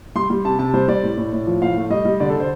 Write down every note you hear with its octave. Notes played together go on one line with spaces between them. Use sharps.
G3 C6
G3
C3 A5
C3 A5
G3 C5
G3 D5
A2
A2
A2
F3
A2 F5
A3
G3 D#5
G3
D3 D5
A4
D3 C5